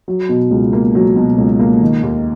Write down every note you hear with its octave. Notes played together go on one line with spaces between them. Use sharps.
F#3
B2
C#2
A#3
F#3
B2
C#2
A#3
D#3
D#2